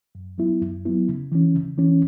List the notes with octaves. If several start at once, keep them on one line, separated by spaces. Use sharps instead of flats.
F#2
F#3 B3 E4
F#2
F#3 B3 E4
C#3
E3 C#4
C#3
E3 C#4